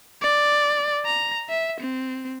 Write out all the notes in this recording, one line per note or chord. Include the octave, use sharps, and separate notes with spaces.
D5
A#5
E5
C4